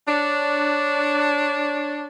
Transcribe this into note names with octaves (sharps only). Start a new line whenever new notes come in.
D4 C#5